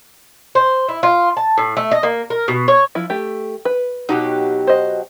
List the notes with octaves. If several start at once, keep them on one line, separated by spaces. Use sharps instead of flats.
C5
E4
F4
A5
A2
A3
D#5
A#3
A#4
B2
C#5
F3 E4
A3 G4
B4
B2 F#3 D#4 G4
C5 D#5